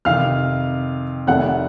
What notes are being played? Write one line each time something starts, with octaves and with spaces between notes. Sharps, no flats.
F2 C3 D#3 F5 F6
F1 F2 D#3 A3 F#5 F#6